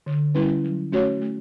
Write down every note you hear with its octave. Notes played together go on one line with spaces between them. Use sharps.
D3
G3 C#4 E4 B4
F#3
A3 C#4 F#4 C#5
A3